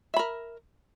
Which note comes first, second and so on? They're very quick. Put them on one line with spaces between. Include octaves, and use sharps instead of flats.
E5 B5 A#4